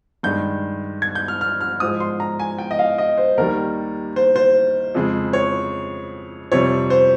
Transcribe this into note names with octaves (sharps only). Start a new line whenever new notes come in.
G2 D#3 G#3 G6
G#6
G6
F6
F6
F6
G#2 F3 G#3 D#6
C6
A#5
G#5
G5
D#5
F5
D#5
C5
D#2 D#3 G3 A#4
C5
C5
F2 C#3 G#3
C#5
F2 C3 G3 C#5
C5